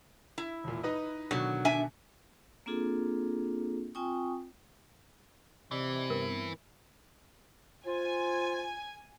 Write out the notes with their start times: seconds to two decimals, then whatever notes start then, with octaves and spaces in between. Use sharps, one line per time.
0.38 E4
0.64 E1 A#2
0.83 D#4 B4 D#5
1.31 B2 D3 D#3 F#3
1.65 D4 E5 G#5
2.66 A#3 C4 D4 F4 G#4 A4
3.95 C4 F4 G5 G#5 C#6 D#6
5.71 C3 E3 D5 D#5
6.10 G2 B3 C4 A#4
7.87 F4 C5 G#5